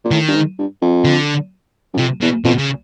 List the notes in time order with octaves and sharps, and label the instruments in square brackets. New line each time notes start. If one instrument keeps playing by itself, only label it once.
[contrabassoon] A#2
[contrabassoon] A2 [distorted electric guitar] D#3
[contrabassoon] G2
G#2
G2
F2
[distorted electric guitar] D3
[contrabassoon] F#2
[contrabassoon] F2 [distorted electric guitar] C3
[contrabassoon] E2 [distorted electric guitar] B2
[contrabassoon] F2 [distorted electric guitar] B2
[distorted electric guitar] C#3